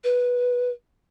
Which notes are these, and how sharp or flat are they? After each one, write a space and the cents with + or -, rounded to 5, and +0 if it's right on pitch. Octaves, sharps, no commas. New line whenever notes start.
B4 -10